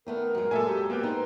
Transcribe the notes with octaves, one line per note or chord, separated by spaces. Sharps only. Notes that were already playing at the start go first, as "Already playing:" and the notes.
D#3 A3 B3 A#4
F#2 G#3
F#2 A#2 G#3 A4 E5 G#5
G4
A#3 B3 B4 G5
D#4 C5